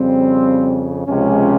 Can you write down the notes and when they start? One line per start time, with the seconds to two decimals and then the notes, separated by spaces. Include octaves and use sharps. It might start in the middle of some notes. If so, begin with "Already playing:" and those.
Already playing: F2 C#3 G3 C4
1.07 C#2 C3 F3 G#3 C#4